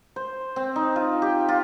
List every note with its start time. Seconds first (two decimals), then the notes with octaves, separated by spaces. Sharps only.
0.16 C5
0.56 C4
0.76 D#4
0.96 F4
1.22 G4
1.49 F4